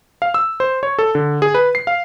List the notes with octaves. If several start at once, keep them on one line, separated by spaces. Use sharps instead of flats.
F5
E6
C5
C#5
A4
D3
G#4
B4
C7
F5